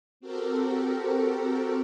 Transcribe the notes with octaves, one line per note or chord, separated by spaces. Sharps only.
C4 F#4 G4 A4 A#4